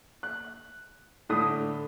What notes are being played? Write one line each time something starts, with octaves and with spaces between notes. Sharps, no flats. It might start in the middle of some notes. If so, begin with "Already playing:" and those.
F#6
A2 D3 D#6